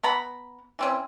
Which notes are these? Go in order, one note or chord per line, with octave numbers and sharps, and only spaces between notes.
B3 A#5 B5
E3 C4 C#4